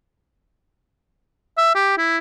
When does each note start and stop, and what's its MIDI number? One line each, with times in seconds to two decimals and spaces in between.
1.58 1.74 76
1.75 1.95 67
1.98 2.17 64